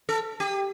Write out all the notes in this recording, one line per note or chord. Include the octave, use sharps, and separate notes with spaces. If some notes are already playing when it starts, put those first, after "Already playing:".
A4
G4